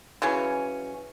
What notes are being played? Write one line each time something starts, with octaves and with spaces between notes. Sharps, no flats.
C#3 E3 F#3 C#4